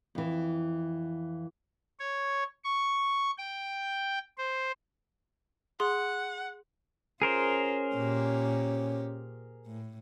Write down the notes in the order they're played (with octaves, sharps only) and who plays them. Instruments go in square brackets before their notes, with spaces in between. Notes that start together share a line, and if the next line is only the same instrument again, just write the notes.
[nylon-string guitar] F2 E3
[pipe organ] C#5
C#6
G5
C5
[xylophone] G#4 C6 [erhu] F#5
[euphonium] C#4 [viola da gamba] F4 [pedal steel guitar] G#4 A#4 C5
[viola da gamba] A#2 G4
A2